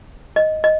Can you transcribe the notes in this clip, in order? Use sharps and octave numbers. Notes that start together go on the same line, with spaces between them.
D#5
D#5